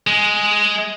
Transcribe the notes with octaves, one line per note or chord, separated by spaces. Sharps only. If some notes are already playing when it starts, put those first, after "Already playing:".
G#3